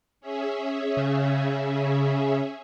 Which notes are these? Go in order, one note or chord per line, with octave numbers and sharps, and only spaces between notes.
C#4 G#4 E5
C#3